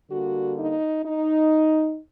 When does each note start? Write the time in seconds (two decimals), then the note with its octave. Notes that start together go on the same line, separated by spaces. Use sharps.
0.11 D3 G3 A#3 F#4
0.58 D#4
1.04 D#4